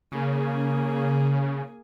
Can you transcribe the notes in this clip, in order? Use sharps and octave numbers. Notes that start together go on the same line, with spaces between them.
C#3 A#3 G#4